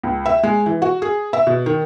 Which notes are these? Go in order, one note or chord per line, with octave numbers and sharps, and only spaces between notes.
C#2
E5
G#3
E3
F#4
G#4
E5
B2
D#3